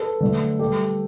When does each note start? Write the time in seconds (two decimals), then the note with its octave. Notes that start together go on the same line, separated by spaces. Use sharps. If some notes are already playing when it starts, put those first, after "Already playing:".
Already playing: A4 B4
0.20 D3 F#3 A3
0.59 G3 G4 A4